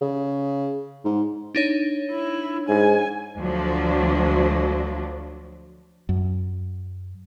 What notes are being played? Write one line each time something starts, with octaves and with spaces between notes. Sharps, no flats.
C#3
G#2
D4 D#4 C#5
E4
G#2 G#5
D2 F3 F#3 D4
F#2